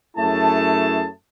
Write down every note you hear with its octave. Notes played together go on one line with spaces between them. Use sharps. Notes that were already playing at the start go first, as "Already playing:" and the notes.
F#2 A3 E4 G#4 C#5 A5